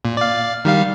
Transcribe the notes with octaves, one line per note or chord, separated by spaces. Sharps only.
A#2
D5 F5
D#3 G3 F5